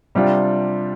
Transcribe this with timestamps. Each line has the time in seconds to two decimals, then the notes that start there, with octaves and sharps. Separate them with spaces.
0.15 C3 G3 D4 F4